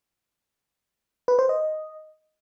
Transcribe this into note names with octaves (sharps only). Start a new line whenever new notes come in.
B4
C5
D#5